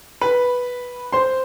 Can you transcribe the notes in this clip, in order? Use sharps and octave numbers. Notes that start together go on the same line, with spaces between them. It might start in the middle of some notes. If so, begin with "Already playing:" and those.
B4 B5
C5 C6